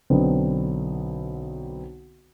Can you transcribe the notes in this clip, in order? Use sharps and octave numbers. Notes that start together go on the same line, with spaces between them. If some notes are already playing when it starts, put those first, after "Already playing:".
B1 D3 B3 C4